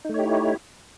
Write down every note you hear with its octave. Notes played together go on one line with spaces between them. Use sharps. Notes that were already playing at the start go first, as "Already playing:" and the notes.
A3 D#4 E4 G4 C#5